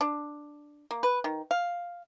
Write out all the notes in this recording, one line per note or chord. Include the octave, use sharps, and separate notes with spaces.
D4
A#3
B4
D#3
F5